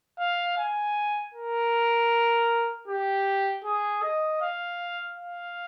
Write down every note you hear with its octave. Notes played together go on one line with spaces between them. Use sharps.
F5
G#5
A#4
G4
G#4
D#5
F5
F5